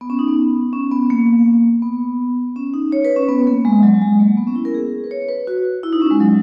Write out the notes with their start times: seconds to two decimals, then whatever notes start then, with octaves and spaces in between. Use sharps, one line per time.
0.01 B3
0.10 C#4
0.19 D#4
0.28 B3
0.73 C#4
0.91 B3
1.10 A#3
1.82 B3
2.56 C#4
2.74 D#4
2.92 C#5
3.05 B4
3.16 C#4
3.28 B3
3.47 A#3
3.65 G#3
3.83 F#3
4.01 G#3
4.20 A#3
4.37 B3
4.47 C#4
4.56 E4
4.65 A#4
4.74 G#4
5.04 B4
5.11 C#5
5.29 B4
5.47 F#4
5.83 E4
5.93 D#4
6.02 C#4
6.11 G#3
6.20 F#3